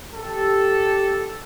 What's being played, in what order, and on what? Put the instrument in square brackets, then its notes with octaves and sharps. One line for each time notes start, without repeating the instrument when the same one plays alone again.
[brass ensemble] G4 A4